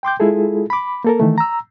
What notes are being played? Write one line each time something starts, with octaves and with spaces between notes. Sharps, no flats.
G5 C6 D6 G6
G#3 E4 F4 G#4 A4
B5 D6
A#3 A4 A#4
D#3 E3 A3
A#5 E6